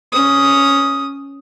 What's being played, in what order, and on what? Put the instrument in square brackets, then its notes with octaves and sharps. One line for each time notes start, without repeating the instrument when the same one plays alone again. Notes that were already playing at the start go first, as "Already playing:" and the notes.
[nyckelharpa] C#4 D#6